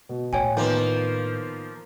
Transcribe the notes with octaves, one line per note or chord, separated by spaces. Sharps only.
B2
A2 C#5 G5 G#5
D#3 F3 A#3 B3